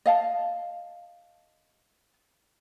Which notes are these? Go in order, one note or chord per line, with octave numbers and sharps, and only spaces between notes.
D#5 F5 A5